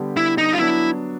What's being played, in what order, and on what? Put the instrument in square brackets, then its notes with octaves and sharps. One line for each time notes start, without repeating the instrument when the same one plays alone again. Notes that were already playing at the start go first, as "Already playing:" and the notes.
Already playing: [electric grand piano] D3 G3 B3 D4 G4
[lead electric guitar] E4
D#4
F4
[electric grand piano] F#3 B3 D4 [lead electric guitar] E4